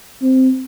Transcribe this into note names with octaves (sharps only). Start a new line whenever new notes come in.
C4